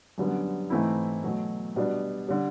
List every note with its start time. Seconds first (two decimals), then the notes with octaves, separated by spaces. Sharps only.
0.18 F#2 D3 G3 B3
0.70 G#2 E3 A3 C4 E4
1.23 B2 F#3 A3
1.76 B2 G3 B3 D4
2.29 D3 G3